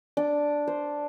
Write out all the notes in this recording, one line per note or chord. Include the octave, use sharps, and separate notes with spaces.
D4
C5